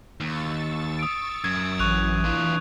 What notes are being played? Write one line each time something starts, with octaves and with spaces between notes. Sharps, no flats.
D#2 C#6 E6 A6
D#6 D7
F#2 G#6
A1 E3 C#6 F#6 F7
D4 F4